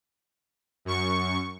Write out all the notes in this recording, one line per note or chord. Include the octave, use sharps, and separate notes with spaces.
F#2 C#6